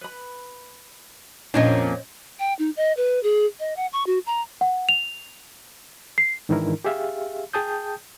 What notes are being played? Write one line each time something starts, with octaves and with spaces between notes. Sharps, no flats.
B4 B5
F2 A#2 F3 C#4 D4 C5 C#5 D#5
G5
D#4
D#5
B4
G#4
D#5
F#5
C#6
F#4
A#5
F#5
F7
C7
G#2 D#3 E3 D4 E4 A#4
G4 G#4 E5 F5
G#4 G5 A5 D#6 G6